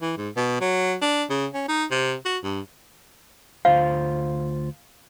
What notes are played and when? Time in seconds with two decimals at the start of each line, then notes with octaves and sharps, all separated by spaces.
0.02 E3
0.18 G#2
0.36 B2
0.61 F#3
1.02 D4
1.30 C#3
1.54 C#4
1.68 D#4
1.91 C3
2.25 F#4
2.43 G2
3.65 D2 F4 C5 F5